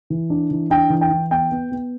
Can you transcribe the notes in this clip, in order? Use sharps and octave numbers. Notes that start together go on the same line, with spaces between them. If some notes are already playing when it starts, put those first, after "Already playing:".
E3
D4
E3
D4 G5
E3
G5
E3
B3 G5
B3
B3